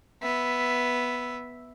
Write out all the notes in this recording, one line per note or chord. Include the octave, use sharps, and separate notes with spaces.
B3 E5